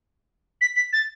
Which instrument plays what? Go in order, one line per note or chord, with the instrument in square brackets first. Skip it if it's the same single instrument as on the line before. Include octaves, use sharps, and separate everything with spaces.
[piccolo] B6
B6
A6